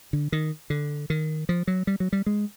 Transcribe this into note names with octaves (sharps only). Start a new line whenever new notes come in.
D3
D#3
D3
D#3
F3
F#3
G3
F#3
G3
G#3